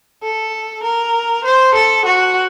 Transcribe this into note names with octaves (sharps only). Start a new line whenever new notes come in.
A4
A#4
C5
A4
F#4